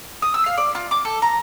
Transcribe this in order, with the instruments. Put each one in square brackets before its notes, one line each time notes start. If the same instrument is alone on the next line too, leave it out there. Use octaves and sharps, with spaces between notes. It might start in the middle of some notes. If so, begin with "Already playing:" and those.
[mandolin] D#6
E6
F5
D5
F4
D6
A4
A#5